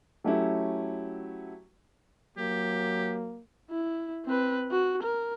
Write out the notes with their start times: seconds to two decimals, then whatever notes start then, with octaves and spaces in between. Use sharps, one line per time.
0.24 F#3 A3 C#4 E4 G4
2.38 F#3 A#3 G4
3.71 E4
4.26 C4 B4
4.72 F#4
5.03 A#4